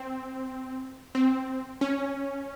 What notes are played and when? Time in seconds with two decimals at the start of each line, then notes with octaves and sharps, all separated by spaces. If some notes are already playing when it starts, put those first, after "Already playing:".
Already playing: C4
1.15 C4
1.81 C#4